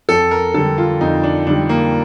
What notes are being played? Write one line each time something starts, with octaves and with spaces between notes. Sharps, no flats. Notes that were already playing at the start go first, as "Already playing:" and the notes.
F2 A4
A#4
D3 G3 A4
F4
F2 D#4
D4
D3 G3 D4
A#3